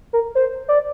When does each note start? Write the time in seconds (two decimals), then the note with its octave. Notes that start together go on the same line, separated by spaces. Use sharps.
0.13 A#4
0.35 C5
0.68 D5